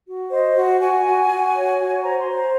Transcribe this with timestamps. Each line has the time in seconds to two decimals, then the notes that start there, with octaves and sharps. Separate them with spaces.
0.07 F#4
0.31 C5 D#5
0.56 F#4
0.80 F#4 G#5
1.05 F#4
1.30 F#4
1.55 C#5
1.79 F#4
2.03 C5 A#5
2.19 C6
2.28 C5
2.36 A#5